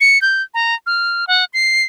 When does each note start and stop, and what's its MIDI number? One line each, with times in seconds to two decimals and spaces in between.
0.01 0.21 97
0.22 0.43 91
0.54 0.75 82
0.86 1.25 89
1.27 1.45 78
1.54 1.84 96